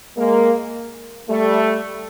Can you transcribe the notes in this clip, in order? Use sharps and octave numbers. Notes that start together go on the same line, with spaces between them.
G#3 A#3
G3 A3